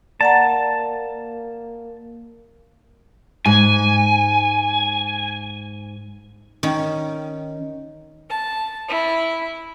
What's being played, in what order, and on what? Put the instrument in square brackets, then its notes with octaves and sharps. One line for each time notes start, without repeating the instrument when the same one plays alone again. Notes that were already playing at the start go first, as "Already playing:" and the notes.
[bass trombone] A#3 [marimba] D5 F#5 A#5 [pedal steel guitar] A5
[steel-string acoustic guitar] G#2 [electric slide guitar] G#5
[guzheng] D#3 C#4
[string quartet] A5
E4